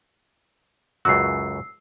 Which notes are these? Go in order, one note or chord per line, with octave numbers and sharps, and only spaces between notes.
C#2 F#2 F#4 E6 C7